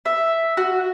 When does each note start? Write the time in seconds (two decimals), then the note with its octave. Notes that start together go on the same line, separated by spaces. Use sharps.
0.05 E5
0.57 F#4